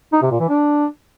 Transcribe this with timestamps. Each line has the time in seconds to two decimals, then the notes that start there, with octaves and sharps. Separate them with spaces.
0.13 D#4
0.22 C3
0.31 A#2
0.40 E3
0.49 D4